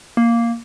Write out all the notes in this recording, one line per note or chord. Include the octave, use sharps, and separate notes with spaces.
A#3